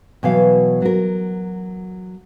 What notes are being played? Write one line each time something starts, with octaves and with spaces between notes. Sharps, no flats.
B2 E3 F#3 B3 F5
F#3 A#4